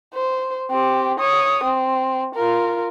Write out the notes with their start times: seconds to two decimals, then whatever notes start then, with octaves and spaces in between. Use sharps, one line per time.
0.14 C5
0.70 C4 G4
1.19 C#5 D#6
1.64 C4
2.35 F4 A#4